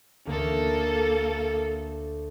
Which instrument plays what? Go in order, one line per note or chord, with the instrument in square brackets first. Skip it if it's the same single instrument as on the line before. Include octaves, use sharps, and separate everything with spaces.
[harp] D2 [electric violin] A#3 A4